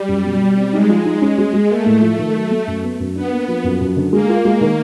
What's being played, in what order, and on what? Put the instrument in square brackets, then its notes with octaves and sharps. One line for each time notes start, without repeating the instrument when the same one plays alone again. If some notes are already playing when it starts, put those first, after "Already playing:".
Already playing: [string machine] G3
[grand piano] F#2
B2
B2
C4
[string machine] G#3 [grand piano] D#4
[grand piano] F3
D#4
C#4
G#3
G#3
[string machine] A3 [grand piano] A#3
[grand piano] A2
F3
D#3
F#3
A3
F#2
B3
F#2
[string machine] B3 [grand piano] D4
[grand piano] A#3
F3
F#2
F#2
D3
[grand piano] G#3 [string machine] A#3
[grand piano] F4
G#3
D#3